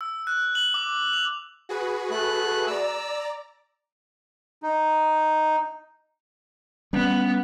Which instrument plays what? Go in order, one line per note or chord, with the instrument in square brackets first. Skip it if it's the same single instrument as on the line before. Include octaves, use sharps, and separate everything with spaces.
[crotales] E6
F#6
F#7
D6
F7
[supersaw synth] F#4 G#4 B4
[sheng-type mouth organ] A3 F#6
[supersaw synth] D5 A#5 [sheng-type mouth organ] E6
[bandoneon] D#4
[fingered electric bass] G3 C#4 [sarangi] B3